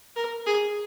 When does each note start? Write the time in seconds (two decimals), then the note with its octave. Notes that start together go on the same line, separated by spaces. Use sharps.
0.16 A#4
0.46 G#4